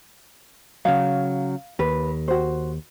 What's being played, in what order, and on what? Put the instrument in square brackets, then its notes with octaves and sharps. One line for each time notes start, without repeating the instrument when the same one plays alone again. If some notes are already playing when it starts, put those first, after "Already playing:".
[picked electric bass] C#3 F#3 [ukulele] F5
[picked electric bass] D#2 [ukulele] B4
[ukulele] F#4 C5